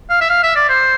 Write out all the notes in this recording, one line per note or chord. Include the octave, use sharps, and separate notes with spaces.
F5
E5
F5
E5
D5
C5